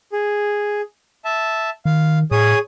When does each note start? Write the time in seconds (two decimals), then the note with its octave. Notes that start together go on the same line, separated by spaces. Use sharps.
0.12 G#4
1.25 E5 A5
1.85 D#3 F5
2.31 A2 G#4 C#5 D#6